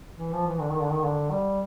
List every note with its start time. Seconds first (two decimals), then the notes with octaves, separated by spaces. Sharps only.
0.18 E3
0.32 F3
0.47 E3
0.61 D3
0.72 D#3
0.82 D3
0.93 D#3
1.04 D3
1.30 G3